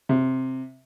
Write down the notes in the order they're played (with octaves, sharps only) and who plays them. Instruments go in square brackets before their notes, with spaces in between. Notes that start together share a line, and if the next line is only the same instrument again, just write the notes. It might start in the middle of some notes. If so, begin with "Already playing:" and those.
[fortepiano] C3